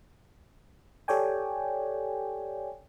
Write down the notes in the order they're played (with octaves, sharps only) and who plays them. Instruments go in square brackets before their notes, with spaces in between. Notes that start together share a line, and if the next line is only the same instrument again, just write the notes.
[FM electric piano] G4 A4 C#5 D5 G5 G#5